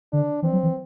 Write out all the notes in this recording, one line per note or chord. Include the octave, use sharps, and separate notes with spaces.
D3 D4
E3 C4
F#3
E3